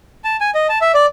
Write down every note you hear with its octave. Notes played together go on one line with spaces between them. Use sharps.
A5
G#5
D#5
A5
E5
D5